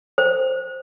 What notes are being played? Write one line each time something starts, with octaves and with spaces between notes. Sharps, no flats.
C5